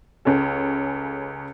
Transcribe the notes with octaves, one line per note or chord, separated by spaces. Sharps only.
C#2 C#3 C#4 A4